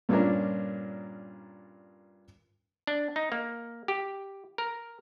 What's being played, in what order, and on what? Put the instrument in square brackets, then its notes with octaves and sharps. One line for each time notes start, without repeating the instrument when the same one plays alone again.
[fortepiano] G2 A#2 C#4 D4 A#4
[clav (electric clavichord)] D4
D#4
A#3
G4
A#4